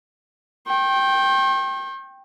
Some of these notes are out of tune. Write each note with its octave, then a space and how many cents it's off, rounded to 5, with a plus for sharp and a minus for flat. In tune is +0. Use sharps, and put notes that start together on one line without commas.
G5 +0 C#6 -45